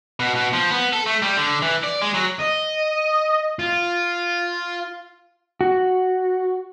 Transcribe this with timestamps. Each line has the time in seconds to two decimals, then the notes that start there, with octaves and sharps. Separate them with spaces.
0.20 B2
0.35 B2
0.53 F3
0.71 B3
0.93 A4
1.06 A3
1.22 G3
1.36 D3
1.62 E3
1.84 D5
2.02 G#3
2.14 F#3
2.39 D#5
3.59 F4
5.61 F#4